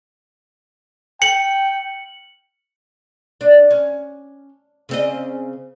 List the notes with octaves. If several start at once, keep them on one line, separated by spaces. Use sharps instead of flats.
G5 C#7 F#7
D4
C#4
C#3 C4 D#5